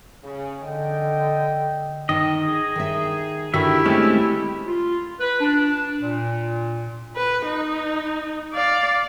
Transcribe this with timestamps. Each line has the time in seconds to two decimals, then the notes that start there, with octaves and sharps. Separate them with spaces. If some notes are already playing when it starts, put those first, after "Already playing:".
0.24 C#3
0.64 D3 A4 D#5 G5
2.09 D#3 D#5
2.45 G#4
2.76 D#3 E5
3.54 D3 D#3 E4 F#4 G4 E5
3.85 G#3 A3 C4 C#4
4.67 F4
5.19 B4
5.40 D4
6.01 A#2
7.16 B4
7.46 D#4
8.54 D5 F5